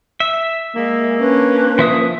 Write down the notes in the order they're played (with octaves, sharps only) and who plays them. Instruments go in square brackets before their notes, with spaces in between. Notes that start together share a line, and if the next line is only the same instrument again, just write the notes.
[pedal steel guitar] E5
[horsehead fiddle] G#3 [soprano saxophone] A#3
[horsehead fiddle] C#4 D4 [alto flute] B4
[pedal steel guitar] F3 E5 D#6